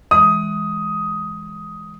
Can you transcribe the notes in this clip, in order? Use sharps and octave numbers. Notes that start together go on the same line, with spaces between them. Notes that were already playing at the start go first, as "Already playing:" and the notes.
E3 G#3 D#6